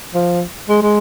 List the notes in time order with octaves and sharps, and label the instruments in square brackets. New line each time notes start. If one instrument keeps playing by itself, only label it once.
[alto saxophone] F3
G#3
G#3